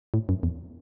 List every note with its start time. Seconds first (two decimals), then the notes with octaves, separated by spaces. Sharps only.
0.14 A2
0.29 F#2
0.43 E2